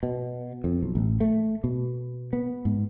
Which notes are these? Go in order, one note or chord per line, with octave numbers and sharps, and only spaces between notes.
B2
F2
B1
A1
A3
B2
B3
G#2